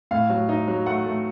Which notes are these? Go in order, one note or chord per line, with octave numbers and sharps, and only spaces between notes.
A2 F5
F#3
D#4
F#3
A3 F#5
A3